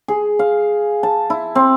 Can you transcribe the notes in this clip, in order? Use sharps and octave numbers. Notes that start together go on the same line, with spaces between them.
G#4
F5
A5
E4
C4